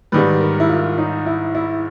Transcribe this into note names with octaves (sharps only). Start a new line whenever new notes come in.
G#2 D#3 G3 B4
A#4
E4
F4
D#4
E4
E4